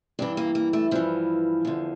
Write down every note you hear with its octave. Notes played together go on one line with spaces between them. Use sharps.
G2 E3 D4
A#3
A#3
A3
G2 E3 F3
E2 D3